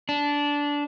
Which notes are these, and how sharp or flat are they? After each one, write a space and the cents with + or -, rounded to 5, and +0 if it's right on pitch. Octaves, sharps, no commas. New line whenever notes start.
D4 -15